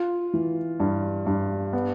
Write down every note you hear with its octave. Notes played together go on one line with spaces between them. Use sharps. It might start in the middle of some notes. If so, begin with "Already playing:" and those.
Already playing: F4
E3
G2
G2
B3